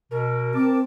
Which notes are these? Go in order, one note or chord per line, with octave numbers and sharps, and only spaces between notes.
B2 A#4
C4 A5 D6